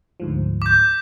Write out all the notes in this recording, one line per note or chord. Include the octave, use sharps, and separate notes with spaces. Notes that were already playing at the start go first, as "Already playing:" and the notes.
D2 G#2 F3
D6 G6